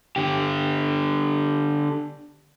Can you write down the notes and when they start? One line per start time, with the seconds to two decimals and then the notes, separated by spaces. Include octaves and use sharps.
0.16 D3 G4